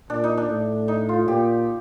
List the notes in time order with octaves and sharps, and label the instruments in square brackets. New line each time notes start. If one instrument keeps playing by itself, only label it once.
[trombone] A#2 [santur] D4
[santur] D#4
D4
[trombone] A2
[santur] D#4
F4
[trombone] A#2 [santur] G4